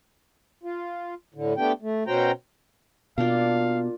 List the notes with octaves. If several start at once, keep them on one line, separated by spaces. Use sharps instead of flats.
F4
A2 D3
A3 B3 D4 G4 G5
A3
B2 C#4 F#4 C5 G5 A#5
B2 A#3 D4 F4 F5